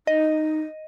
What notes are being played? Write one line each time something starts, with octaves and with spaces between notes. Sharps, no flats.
D#4 D#5